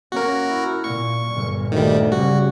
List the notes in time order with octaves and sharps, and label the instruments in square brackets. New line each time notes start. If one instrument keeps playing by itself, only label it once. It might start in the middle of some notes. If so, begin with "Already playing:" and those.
[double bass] A#3 C#4 [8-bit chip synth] F#4 A#4
[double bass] E4
[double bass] A#2 [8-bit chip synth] C#6
[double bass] G1 A#2
[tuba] D2 [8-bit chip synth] D#3 G3
[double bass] C#3 [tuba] G3 [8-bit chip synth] F#4